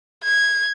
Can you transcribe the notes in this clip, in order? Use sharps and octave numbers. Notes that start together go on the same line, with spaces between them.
G#6